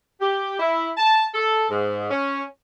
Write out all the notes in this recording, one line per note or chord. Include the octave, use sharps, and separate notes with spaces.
G4
E4
A5
A4
G#2
C#4